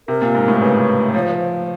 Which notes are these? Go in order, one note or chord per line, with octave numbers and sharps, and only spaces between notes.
C3 A#4
A#2
G#2
A2
C#3 B4
F3 C#5
C5
B4
C5